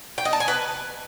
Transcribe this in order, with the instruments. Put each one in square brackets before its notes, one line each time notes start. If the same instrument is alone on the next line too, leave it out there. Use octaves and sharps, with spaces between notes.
[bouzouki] G5
D#5
A5
G#5
B4